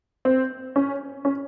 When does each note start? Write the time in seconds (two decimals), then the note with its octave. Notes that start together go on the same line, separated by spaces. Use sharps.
0.25 C4
0.76 C#4
1.25 C#4